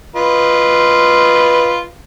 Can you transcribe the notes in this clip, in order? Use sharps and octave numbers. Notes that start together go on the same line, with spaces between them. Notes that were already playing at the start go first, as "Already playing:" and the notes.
F4 B4 D#5